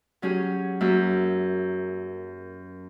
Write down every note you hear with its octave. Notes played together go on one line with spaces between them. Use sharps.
F#3 C#4 G4 G#4
F#2 A#3 E5